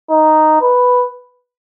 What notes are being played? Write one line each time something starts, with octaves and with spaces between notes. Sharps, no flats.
D#4
B4